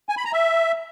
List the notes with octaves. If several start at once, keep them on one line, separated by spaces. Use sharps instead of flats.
G#5
B5
A#5
E5